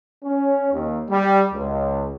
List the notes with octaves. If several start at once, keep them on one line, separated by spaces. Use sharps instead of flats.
C#4
D#2
G3
C#2